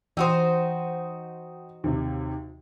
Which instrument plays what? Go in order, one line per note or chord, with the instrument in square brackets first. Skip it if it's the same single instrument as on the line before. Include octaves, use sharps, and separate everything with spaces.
[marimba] E3 E6 [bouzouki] D#4 F#4 C5 [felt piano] G5 D#6
[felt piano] D#2 C3